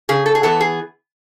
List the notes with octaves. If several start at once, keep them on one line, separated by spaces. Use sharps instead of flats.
C#3 G#4
A4
G#4
E3 B3 A4
G#4